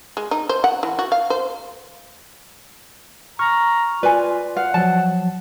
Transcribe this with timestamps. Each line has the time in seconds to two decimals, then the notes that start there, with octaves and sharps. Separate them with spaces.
0.17 G#3
0.31 D#4
0.49 C5
0.64 F#5
0.83 E3
0.99 F#4
1.12 F5
1.30 C5
3.39 A#5 C#6 F6
4.03 F4 B4 D5 G#5
4.57 F5 F#5
4.74 F3 F#3 A5